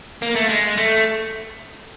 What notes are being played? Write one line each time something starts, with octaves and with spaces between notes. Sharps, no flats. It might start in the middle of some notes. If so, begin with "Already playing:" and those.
A#3
A3
G#3
A3